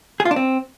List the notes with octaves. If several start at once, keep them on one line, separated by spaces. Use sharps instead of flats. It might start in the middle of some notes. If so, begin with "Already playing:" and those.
G#4
F4
D4
C4